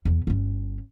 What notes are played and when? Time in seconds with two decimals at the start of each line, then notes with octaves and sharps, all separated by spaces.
0.05 E2 B3
0.27 G1 C#4